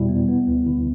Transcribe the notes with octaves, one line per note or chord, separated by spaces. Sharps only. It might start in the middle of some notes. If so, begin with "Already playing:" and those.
Already playing: E2 B2 G3 E4
B3
B3
D2
D3